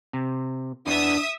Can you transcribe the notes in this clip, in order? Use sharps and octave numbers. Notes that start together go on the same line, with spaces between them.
C3
E2 B3 D4 E5 D#6